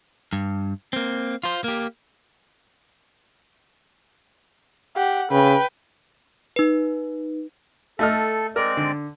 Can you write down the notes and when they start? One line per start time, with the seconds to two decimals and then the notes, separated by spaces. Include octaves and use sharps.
0.33 G2
0.93 A#3 C4
1.44 F4 C5
1.64 A#3 G4
4.96 G4 F#5
5.31 C#3 B4 G5
6.56 D#4 B4
7.99 A3 A4 D#5 F6
8.56 G#3 C4 A#4 D5
8.77 D3